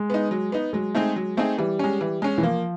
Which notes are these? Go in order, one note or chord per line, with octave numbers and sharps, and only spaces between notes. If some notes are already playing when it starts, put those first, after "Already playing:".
Already playing: G#3
B3 D#4
F#3
B3 D#4
F#3 G#3
A3 C4 D#4 G#4
F#3
A3 C4 D#4 G#4
E3 G3
G#3 C#4
E3
G#3 C#4
E3
F3 A#3